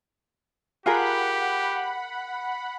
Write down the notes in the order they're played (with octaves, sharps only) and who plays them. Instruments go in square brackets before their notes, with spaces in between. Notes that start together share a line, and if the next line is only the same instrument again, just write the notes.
[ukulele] F4 G#4 A#4 [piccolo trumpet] G4 [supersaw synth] F#5 B5